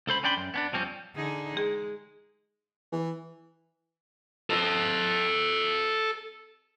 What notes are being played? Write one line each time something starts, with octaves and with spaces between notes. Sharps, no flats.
C#2 A4 C5 B5
C#4 D4 D5 G5 B5 C6
F#2
B3 C#4 D4
F2 F3 G3 C4 C#4
D3 D#4 G#4
G#3 G#4
E3
A4 D#5